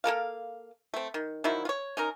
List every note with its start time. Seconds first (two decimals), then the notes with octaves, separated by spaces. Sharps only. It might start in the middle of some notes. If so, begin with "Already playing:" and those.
0.04 A#3 A4 A#4 F5
0.94 A3 C4
1.14 D#3
1.44 D#3 F3 F#3 E4
1.65 F4 C#5
1.97 C#4 D#4 A#4